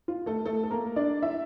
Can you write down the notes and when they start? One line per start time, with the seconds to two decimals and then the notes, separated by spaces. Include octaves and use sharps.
0.08 F4
0.26 A3 A4
0.46 A3 A4
0.64 A4
0.71 A#3 A#4
0.96 D4 D5
1.22 E4 E5